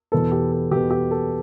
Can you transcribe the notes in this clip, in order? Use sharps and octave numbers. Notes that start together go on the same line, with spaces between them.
E2 B2 B3 A4
G4
A4
E2 B2 B3 G4
G4
A4